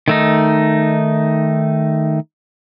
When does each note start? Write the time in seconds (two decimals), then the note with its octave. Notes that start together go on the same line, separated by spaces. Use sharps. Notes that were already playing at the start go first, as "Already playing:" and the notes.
0.08 D#3 A3 D#4